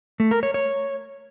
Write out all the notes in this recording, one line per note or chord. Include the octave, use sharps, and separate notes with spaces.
A3
A#4
C#5
C#5